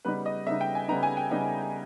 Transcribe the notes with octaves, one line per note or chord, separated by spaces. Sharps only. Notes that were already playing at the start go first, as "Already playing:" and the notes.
C#3 G3 B3 D#4 B4
D#5
C#3 G3 B3 D#4 E5
G5
G#5
C#3 G3 B3 D#4 A#5
G#5
G5
C#3 G3 B3 D#4